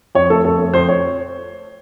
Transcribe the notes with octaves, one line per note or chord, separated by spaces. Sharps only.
F2 C#5
A3 A4
F2 A4
A3
F2 C5
C#5